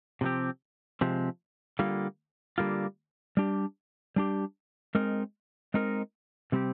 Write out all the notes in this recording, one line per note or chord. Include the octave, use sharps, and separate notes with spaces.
C3 F3 G#3 C4 G4
C3 F3 G#3 C4 G4
D3 G3 A#3 F4
D3 G3 A#3 F4
G3 D4 G4
G3 D4 G4
G#3 C4 D#4 A#4
G#3 C4 D#4 A#4
C3 G3 C4 G4